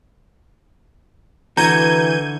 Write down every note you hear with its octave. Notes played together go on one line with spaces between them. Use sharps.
D3 E3 F#4 A#5 G6 G#6 D#7